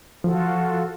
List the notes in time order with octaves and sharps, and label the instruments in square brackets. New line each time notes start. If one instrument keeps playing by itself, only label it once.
[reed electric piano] F3 [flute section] F4 F#4 A4